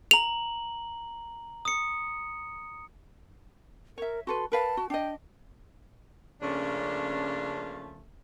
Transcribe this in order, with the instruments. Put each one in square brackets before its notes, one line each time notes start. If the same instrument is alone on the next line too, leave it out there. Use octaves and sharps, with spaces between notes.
[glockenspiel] A#5 F#7 [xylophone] F7
[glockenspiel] D#6 C#7
[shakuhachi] A#4 [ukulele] C#5 E5
[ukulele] F#4 A4 B4 [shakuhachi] C6
[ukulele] A#4 B4 F5 [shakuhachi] A5
[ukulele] F#4
[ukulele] D4 D#5 [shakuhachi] G5
[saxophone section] C#3 F3 A3 A#3 C#4 D4